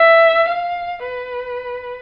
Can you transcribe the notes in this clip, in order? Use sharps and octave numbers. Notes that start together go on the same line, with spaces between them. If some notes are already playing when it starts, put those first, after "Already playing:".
Already playing: E5
F5
B4